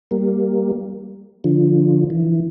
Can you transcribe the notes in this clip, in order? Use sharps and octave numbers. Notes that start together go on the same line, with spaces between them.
G3 A#3
D3 F3
E3